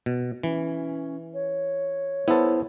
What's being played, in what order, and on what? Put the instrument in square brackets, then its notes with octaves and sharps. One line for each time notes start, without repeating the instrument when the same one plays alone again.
[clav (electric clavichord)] B2
[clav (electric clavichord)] E3 [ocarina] C#4
[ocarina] C#5
[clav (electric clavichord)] B3 A4 [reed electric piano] E4 C5